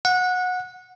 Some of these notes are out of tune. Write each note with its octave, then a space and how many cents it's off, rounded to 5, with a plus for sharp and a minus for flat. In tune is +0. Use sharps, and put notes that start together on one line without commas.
F#5 -20